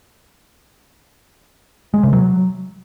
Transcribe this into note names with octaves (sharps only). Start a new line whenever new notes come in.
G#3
C3
F#3